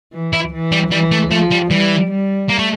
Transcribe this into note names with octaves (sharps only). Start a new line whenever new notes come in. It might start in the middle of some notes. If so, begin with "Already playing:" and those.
E3
E4
E3
G3
E3 G3
A3
F3 A3
G3
E3 G3
G3
A#3
A3